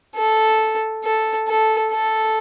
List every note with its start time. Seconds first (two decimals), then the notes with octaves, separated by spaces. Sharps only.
0.16 A4
1.04 A4
1.48 A4
1.91 A4